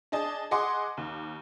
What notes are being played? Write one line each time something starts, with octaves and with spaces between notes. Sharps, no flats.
D4 G#4 D#5 A5
G#4 D#5 F#5 C6 D6
D#2